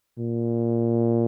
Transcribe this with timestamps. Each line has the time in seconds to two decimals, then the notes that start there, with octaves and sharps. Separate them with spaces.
0.18 A#2